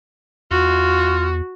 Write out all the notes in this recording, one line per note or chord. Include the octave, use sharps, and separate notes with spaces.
E2 F4 F#4